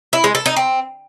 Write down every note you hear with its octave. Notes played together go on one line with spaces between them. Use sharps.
E4
G#3
A4
D#4
C4